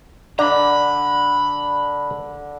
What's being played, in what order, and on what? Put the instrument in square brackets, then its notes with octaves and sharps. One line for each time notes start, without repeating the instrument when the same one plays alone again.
[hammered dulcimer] D3 [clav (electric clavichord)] D5 [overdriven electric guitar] A#5 B5